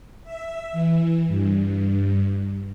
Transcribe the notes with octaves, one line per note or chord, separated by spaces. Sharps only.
E5
E3
G2